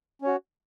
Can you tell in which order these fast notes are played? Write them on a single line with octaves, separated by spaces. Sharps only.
C#4 C#5 F#4